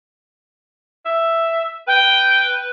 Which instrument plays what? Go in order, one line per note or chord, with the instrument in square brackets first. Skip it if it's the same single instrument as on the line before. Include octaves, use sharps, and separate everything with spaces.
[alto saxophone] E5
[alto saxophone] B4 [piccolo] G5